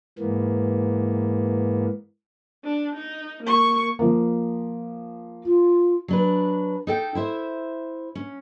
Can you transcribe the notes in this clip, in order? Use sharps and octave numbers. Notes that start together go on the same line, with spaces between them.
G#2 E3 A#3 B3
D4
D#4
A#3 C#6
F3 A#3
F4
F#3 D4 B4
D#4 A4 G5
E4 C5 E5
C#4